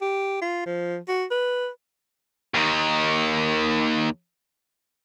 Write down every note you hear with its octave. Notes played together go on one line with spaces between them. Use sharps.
G4
F4
F3
F#4
B4
D#2 D#3